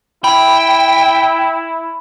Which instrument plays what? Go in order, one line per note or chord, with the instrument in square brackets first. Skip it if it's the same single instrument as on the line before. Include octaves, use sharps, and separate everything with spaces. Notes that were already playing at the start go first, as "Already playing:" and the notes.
[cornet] E4 [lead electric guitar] G5 [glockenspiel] B5